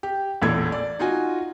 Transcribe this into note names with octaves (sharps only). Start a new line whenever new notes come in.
G4
A1 E2 A#2 A4 G#6
D5
D#4 F4 F#4 G#5